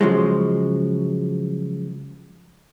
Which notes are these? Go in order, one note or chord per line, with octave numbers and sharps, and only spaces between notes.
C#3 F3 F#3 G#3